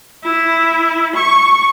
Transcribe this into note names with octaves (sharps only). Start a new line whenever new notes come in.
E4
C#6